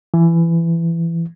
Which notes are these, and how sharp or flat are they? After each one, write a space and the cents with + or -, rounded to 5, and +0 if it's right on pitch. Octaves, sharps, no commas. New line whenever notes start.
E3 +20